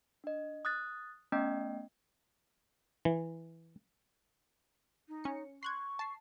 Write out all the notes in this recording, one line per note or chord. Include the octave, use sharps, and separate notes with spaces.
D4 D#5
D#6 F#6 A6
A3 B3 C#4 D#5 G5
E3
D#4
C#4 C#7
C6 C#6 F#6 G#6
A5 C7